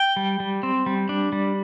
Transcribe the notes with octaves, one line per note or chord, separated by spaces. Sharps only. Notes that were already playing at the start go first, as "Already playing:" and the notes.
Already playing: G5
G3
G3
C4
G3
D4
G3